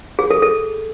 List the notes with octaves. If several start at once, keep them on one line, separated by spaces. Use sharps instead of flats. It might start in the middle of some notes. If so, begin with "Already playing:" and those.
G#4
A4
A4